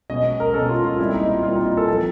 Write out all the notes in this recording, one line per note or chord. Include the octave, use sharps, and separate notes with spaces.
B2 G#3 C#4 D#5
A#4
B2 G#3 C#4 A4
F4
F4
A#2 G3 C4 E4
D#4
F4
A#2 G3 C4 F4
D#4
F4
A4
F3 A3 C4 A4